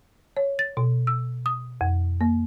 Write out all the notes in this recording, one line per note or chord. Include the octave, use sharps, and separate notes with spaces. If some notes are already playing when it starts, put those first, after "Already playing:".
C#5
A6
B2
E6
D#6
F2
A#3